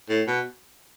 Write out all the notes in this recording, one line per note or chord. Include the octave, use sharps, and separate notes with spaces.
A2
B2